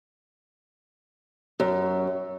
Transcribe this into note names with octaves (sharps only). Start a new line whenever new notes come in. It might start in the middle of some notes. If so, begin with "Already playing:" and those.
F#2